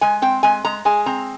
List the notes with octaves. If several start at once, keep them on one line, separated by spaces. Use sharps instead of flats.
G#3 G#5
C4 G5
G#3 G#5
G#3 A#5
G#3 G#5
C4 A#5